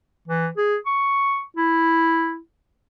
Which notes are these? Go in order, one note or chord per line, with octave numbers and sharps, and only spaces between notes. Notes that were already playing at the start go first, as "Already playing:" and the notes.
E3
G#4
C#6
E4